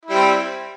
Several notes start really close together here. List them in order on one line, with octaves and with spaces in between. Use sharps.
E4 G3 C4